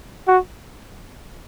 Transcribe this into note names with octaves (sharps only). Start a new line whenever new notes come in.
F#4